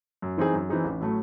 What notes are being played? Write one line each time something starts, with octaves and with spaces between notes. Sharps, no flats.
F#2
E3 C4 D#4 G#4
F#2
E3 C4 D#4 G#4
A1
A2 F#3 A3